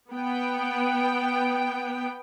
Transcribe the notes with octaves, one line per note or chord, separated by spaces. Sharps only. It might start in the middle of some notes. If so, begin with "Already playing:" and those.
B3 G5